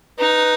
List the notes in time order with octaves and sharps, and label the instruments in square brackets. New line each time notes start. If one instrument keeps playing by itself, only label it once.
[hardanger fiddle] D#4 [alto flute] B4